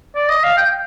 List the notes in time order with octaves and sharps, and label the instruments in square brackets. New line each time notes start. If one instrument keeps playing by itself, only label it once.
[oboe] D5
D#5
F5
G5